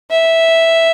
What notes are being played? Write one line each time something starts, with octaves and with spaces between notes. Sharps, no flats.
E5